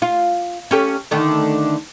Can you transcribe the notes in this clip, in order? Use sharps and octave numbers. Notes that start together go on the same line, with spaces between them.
F4
C#4 G4 A4
D3 D#3 A3